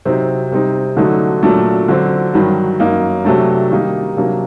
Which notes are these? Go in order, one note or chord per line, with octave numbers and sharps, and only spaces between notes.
C3 F#3 C4 D#4
C3 G3 C4 D#4
D3 F#3 A3 D#4
A#2 F#3 A3 D4
D3 F#3 C4
G2 D#3 F#3
F#2 F#3 A#3 D#4
C3 F#3 A3 D4
D#3 G3 A#3 D#4
C3 F#3 A#3 D4